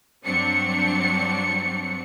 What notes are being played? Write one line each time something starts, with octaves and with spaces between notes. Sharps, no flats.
G2 F#3 C4 D4 C#7